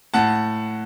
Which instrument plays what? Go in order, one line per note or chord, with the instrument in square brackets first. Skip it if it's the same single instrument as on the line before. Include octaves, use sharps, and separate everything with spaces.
[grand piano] A2 F#5 A5